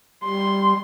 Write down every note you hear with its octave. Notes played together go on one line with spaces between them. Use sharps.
G3 C6